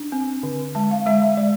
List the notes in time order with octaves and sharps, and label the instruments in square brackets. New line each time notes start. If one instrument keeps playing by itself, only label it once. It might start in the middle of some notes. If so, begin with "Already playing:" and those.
Already playing: [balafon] D4
C4
D3
G#3 A5
F5
G#3 E5
E5
G#3 D5